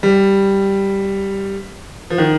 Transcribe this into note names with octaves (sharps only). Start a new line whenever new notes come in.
G3
F3
D#3